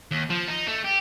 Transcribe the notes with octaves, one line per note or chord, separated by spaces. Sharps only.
D#2
F3
D#4
A3
G4